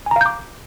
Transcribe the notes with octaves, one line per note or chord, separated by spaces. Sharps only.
F5 G#5 A#5 D6 G6